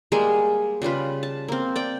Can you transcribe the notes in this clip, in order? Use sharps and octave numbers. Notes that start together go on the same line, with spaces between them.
G3 G#3 A#3 G#4
C#3 G3 F4 B4
A5
A#3 C4
D5 G5